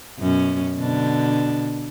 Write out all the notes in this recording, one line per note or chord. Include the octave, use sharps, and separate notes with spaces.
F#2 B2 C#4
B2 D3 D4